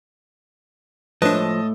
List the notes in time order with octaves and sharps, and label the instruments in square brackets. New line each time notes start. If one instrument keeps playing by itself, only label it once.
[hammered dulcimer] A2 [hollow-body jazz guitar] F3 [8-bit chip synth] D4 B4 [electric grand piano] D#5 A5